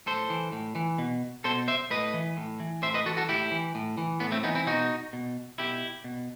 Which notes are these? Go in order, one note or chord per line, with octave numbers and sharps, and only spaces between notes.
A2 A4 C5
E3
A2
E3
B2
B2 A4 C5
C5 E5
A2 B4 D#5
E3
A2
E3
A2 C5 E5
B4 D#5
E3 F#4 A4
F#4 A4
A2 E4 G4
E3
A2
E3
A2 B3
A3 C4
E3 B3 D#4
C4 E4
B2 D#4 F#4
B2
B2 E4 G4
B2